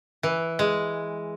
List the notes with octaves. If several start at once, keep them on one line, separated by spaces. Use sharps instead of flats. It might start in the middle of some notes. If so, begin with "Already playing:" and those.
E3
G#3